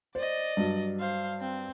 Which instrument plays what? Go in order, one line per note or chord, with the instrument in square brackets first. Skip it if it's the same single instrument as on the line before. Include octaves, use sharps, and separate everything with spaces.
[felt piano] C5 [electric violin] D5 D#5
[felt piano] G2 F#3
[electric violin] C5 F5
C4